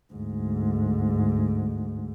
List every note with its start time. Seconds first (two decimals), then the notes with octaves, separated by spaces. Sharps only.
0.14 D2 G#2